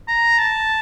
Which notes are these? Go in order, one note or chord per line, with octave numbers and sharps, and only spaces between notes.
A#5
A5